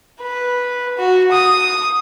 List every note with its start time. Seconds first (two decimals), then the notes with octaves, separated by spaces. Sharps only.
0.21 B4
0.98 F#4
1.32 D#6